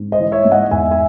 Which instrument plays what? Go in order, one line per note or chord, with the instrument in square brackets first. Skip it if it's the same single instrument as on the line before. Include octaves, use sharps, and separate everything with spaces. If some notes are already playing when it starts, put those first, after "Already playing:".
Already playing: [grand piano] G#2
C5 D#5
E3
C#5 E5
G#2
D#5 F#5
E2 E5 G#5
E5 G#5